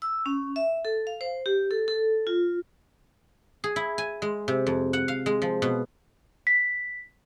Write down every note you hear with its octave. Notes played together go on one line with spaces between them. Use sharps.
E6
C#4
E5
A4
F5
C5
G4
A4
A4
F4
G#4
E4
G#5
G#3
C3
F2
F#5
F5
G#3
F3
B2
B6